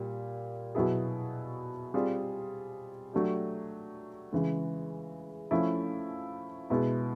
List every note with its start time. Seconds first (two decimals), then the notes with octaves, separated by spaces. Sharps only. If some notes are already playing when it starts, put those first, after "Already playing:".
Already playing: A#2 G3
0.75 B2 F#3 B3 E4 G#4
1.94 G3 C4 F4 G#4
3.13 F#3 A3 D4 G4
4.32 C#3 E3 G#3
5.51 F3 A3 C#4 E4
6.70 B2 G#3 B3 E4